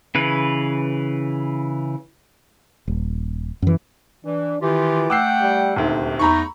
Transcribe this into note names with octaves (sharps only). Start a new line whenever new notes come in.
C#3 E3 B4
D#1
F#2 E3
E3 D4
D#3 E3 F4 G4
A3 F#5 G5 D6 E6 C7
G3
D#1 D2 C3 D#3
E2 A3 D#4 A#5 B5 C#6